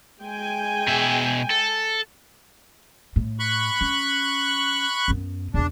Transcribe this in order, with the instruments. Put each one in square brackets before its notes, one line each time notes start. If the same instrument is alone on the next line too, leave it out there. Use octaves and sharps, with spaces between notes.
[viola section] G#3 G5 G#5
[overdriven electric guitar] B2 E5
A4
[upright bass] A2
[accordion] B5 C#6 F#6
[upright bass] C#4
F#2 B3
[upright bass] E2 C#3 [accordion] D4